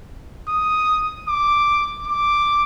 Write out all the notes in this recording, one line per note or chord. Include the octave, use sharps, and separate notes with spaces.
D#6
D6
D6